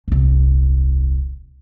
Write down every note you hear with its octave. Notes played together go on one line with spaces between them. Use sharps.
D#1 C2